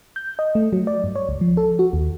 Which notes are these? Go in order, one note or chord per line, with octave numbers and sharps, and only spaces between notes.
G6
D#5
A3
F#3
D5
G2
C#5
C#2
F3
A4
F#4
D#2